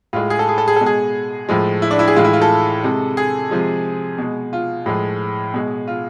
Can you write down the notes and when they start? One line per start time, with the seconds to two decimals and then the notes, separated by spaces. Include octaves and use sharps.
0.13 A2 G#3 F4
0.30 G#4
0.39 A4
0.49 G#4
0.58 A4
0.68 G#4
0.76 B2 G#3 A4
0.86 G#4
1.49 A2 F3 G#3
1.82 E4
1.91 D4
1.99 E4
2.08 G#4
2.16 A2 E3 G#3 F4
2.24 E4
2.33 F4
2.42 A4
2.84 C3 G#3
3.17 G#4
3.51 C3 F3 G#3
4.18 B2 G#3
4.53 F4
4.86 A2 F3 G#3
5.54 B2 G#3
5.87 F4